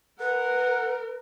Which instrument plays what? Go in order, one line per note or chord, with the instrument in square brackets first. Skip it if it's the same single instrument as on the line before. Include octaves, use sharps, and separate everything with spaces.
[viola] A#4 [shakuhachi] B4 [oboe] F#5